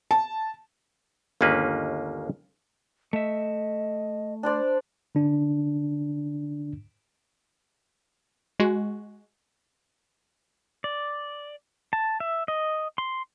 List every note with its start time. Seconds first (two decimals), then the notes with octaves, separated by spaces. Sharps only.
0.11 A5
1.41 G1 D#2 G#3 A#3 C#4 B4
3.13 A3 D#5 E5
4.43 D4 C5 D5
5.15 D3 D4
8.59 G#3 F#4
10.84 D5
11.93 A5
12.20 E5
12.48 D#5
12.98 C6